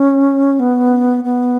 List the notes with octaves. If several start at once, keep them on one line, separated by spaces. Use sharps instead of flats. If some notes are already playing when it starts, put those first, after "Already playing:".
Already playing: C#4
B3
B3